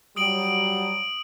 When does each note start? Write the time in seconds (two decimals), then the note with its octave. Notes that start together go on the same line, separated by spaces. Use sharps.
0.16 F#3 G3 D#6 D7 F#7